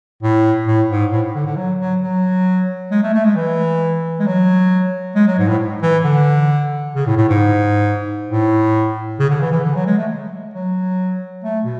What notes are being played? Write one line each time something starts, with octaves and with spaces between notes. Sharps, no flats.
A2
A2
G#2
A2
D3
D3
F#3
F#3
F#3
G#3
A3
A3
G#3
E3
G#3
F#3
G#3
F#3
G#2
A2
E3
D3
C#3
A2
A2
G#2
A2
C#3
D3
E3
E3
D3
F#3
G#3
A3
F#3
A3
B2